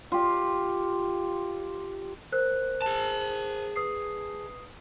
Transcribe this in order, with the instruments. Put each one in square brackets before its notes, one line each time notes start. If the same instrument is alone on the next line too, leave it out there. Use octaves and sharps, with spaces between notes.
[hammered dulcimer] F4 G4
[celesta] A#4 C5 F#6
[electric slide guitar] G#4 A5
[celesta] B4 D#6 C7